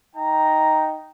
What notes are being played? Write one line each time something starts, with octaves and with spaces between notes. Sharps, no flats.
D#4 G5 A#5